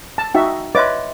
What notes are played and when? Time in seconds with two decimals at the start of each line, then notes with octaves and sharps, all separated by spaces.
0.18 A5
0.35 D#4 F#4 E5 G5
0.75 B4 C#5 D#5 E5 C6 D6